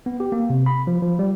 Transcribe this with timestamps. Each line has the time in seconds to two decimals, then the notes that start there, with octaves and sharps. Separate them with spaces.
0.06 B3
0.20 G4
0.32 A#3
0.50 C3
0.66 B5
0.87 F3
1.02 F3
1.19 G3